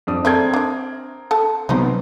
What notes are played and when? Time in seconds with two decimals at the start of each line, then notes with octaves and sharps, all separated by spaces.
0.07 F2 D4 D#6
0.25 C4 A4 A#4 E5 G#6
0.54 D4 E5
1.31 A4 A5
1.69 C3 F#3 B3 C#4 D#4 C5